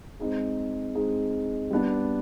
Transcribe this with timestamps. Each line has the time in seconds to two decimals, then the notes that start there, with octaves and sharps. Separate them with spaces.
0.19 G#3 C4 D#4 G#4
0.95 G#3 C4 D#4 G#4
1.71 G3 B3 D4